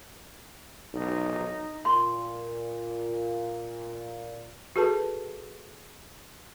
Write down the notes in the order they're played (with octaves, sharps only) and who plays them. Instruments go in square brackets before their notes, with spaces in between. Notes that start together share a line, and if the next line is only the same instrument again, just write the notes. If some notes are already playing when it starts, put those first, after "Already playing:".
[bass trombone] B1 [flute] D#4
[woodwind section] A#2 [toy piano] C6
[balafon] F#4 G#4 A4 B4 A5